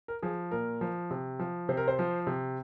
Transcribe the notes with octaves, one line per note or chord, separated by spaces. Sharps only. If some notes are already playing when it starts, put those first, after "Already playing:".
A#4
F3 G#4
A#2 A#4
F3
C3
F3
C3 C5
A#4
C5
F3
C3